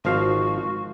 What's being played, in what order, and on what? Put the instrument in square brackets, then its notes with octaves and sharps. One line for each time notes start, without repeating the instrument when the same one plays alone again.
[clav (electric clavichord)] G#1 F3 F5 [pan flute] F#4